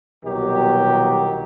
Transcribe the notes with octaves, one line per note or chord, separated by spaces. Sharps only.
C2 B2 D#3 F#3 G4